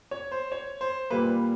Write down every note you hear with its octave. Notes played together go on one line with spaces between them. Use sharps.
C#5
C5
C#5
C5
A#2 G3 A#3 B4